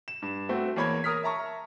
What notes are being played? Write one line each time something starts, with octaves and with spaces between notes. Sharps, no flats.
E7
G2
A3 C4 F#4
E2 A#3 C#5 B5 G#6
A#4 D#6 F6 B6
E5 A5 A#5 C#6